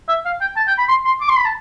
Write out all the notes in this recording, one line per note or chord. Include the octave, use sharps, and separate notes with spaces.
E5
F5
G5
A5
G5
B5
C6
C6
D6
C6
B5
A5